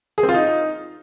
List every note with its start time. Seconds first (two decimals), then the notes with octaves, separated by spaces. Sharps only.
0.18 G#4
0.23 C4
0.29 F4
0.34 D#4